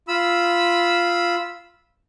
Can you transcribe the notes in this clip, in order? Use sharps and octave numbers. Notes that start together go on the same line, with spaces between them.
F4 B5 E6